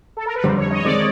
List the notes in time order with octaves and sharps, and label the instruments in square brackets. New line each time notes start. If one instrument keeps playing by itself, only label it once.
[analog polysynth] A4
A#4
B4
[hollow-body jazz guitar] F2 D3 G3 [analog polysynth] C5
[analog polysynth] C#5
D#5
C#5
[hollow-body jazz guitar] D#3 G#3 C4 D#4 [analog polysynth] D5